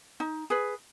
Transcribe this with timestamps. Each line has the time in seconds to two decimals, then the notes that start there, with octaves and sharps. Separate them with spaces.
0.20 D#4
0.50 G#4 B4